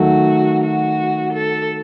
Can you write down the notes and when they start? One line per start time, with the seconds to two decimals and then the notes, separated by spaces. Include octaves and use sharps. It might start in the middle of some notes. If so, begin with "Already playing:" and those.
Already playing: D#3 F#3 A3 F#4
0.63 F#4
1.33 A4